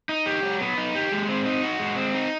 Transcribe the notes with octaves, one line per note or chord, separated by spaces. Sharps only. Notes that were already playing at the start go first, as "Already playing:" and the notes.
D#4
G4
F#3
B3
D#4
G4
G#3
C4
D#4
F#4
G#3
C4
D#4